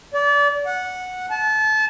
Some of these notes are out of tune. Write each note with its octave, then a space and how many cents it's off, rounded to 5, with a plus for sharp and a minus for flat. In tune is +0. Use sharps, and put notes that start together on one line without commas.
D5 -30
F#5 -10
A5 -30